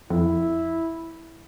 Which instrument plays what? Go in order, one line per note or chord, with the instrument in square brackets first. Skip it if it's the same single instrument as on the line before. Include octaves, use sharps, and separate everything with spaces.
[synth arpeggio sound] F2 [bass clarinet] E4